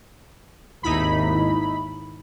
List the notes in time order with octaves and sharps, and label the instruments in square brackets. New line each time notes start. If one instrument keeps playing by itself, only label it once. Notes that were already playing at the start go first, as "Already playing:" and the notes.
[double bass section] G#1 D#2 [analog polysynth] D#4 E4 B5